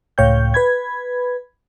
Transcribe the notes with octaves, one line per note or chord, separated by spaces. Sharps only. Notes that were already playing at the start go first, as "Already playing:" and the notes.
C#2 A2 C#5 F5 G5 G6
B4 B5 G#6